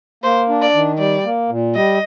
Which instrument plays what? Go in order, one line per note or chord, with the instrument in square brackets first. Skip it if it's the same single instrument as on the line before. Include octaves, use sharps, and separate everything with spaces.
[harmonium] A#3 [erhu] C5
[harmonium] D4
[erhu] D5
[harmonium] D#3
[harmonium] G3 [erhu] D5
[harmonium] A#3
A#2
[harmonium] G3 [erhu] D#5